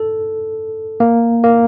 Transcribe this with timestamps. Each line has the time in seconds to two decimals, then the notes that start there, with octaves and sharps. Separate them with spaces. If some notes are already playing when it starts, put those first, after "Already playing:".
Already playing: A4
1.00 A#3
1.44 A#3